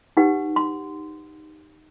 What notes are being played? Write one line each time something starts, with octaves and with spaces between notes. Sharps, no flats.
D#4 G4 B4 F#5
C6